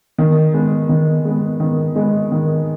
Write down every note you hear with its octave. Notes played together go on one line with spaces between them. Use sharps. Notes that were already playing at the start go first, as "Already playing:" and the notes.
D#3
G#3 B3
D#3
G#3 B3
D#3
G#3 B3
D#3